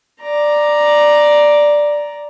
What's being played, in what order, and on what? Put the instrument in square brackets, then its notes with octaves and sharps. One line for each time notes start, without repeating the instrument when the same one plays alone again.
[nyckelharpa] D5 A#5